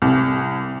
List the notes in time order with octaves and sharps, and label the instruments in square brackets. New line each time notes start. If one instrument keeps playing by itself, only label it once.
[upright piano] C2